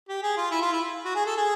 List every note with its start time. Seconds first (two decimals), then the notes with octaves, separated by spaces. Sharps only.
0.09 G4
0.23 G#4
0.37 F4
0.51 E4
0.62 F4
0.73 E4
1.05 F#4
1.15 G#4
1.26 A4
1.36 G#4